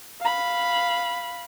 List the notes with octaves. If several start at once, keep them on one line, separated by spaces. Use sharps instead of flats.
F5 B5